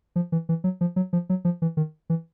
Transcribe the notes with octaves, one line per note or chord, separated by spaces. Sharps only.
F3
E3
E3
F#3
F3
F#3
F3
F#3
F3
E3
D#3
E3